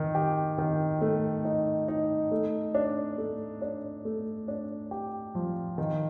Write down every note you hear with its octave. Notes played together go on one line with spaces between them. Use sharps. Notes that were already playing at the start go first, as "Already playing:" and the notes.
Already playing: D#3
G4
D#3
A3
D#4
D#4
A3
D4
A3
D4
A3
D4
G4
F3
D#3